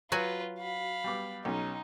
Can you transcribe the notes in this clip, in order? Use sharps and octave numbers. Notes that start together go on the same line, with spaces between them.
F#3 F4 F#4 B4 G#5
F5 B5
G3 B3 D6
B1 C#4 D#4